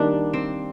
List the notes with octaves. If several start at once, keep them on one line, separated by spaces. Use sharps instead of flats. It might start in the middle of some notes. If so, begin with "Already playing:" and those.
Already playing: D#3 G3 A#3 D4
C4